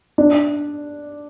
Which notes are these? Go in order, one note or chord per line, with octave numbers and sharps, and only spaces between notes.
D4